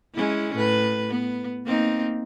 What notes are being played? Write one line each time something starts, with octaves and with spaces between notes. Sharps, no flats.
G#3 C#4 E4
A2 B4
B3
A#3 C4 D#4